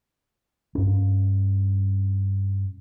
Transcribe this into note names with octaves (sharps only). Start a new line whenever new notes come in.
G2 C#4